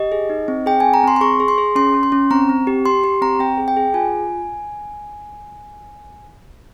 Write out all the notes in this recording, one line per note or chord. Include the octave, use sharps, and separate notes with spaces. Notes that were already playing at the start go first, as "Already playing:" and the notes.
Already playing: G4 D#5
G#4
D#4
C4
G#4 G5
C4 G#5
A#5
C4 C6
C6
G#4 C#6
G#4
C6
G#4
C#4 C6
C#4
C6
C#4
C4 A#5
C4
G4
G4 C6
G4 C6
C4 A#5
C4 G5
G#4
G5
G#4
F4 G#5